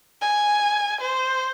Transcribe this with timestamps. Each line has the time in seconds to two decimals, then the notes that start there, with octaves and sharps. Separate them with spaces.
0.21 G#5
1.01 C5